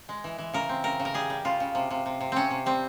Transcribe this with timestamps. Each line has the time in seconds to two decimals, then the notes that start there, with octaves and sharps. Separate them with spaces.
0.09 G#3
0.24 E3
0.39 E3
0.54 C#3 A#4
0.69 C4
0.84 C#3 A#4
0.99 C#3
1.05 A#4
1.14 G3 G#4
1.30 G3
1.45 C#3 F4
1.60 C#3
1.75 C3
1.91 C3
2.06 C3
2.21 C3
2.32 C3 C4 C#4
2.51 C3
2.66 G3 C4